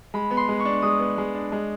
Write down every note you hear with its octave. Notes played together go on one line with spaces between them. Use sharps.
G#3 B5
B3
C6
G#3
C#6
D4
G#3 D#6
B3
G#3
D4
G#3